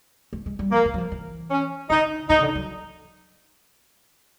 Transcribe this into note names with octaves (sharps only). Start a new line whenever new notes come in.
A3
G#3
G3
F3 A#3
D#3
F#3
F3
E3
C#4
D3 D#4
D#3 D#4
C#3
D3
F#3